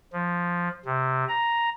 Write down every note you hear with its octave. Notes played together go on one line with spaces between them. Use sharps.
F3
C3
A#5